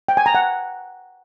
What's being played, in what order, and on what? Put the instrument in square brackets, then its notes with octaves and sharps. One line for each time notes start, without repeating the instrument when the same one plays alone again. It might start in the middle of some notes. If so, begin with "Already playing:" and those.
[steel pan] G5
G#5
A#5
F#5